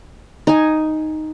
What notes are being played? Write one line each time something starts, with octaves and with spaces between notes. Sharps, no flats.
D#4 G#5